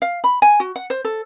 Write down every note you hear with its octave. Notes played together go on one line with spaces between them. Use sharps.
F5
B5
G#5
F#4
F#5
C5
A4